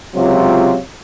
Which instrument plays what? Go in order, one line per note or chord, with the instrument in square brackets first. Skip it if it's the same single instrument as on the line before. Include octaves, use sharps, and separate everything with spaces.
[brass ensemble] C#2 C3 F#3 C4 F4